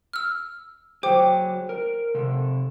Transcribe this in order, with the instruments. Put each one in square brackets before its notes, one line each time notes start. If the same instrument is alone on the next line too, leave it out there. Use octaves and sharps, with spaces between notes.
[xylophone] E6 F6
[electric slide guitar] F#3 G#4 [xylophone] C5 G5 D6
[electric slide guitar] A#4
C3 A4